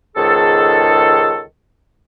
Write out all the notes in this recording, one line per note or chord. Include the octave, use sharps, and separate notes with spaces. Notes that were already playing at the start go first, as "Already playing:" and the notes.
C#2 G#2 D#3 G#4 A4